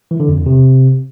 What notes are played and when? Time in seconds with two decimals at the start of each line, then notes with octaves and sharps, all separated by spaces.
0.11 E3
0.20 D3
0.29 F2
0.37 E2
0.46 C3